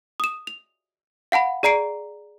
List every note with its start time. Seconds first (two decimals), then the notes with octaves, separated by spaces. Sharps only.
0.20 D#6 E7
0.47 F7
1.32 F5 F#5 A5 B5
1.63 G#4 D5 A#5 C7 D7